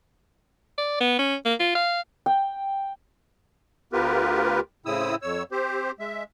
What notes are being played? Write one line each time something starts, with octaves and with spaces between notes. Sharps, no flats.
D5
B3
C#4
A#3
F4
F5
G5
D2 B3 F4 G4 A#4 B4
A2 C#3 C4 E4 D#6 E6
F2 C#5 E6
C4 G4 C5
G#3 E5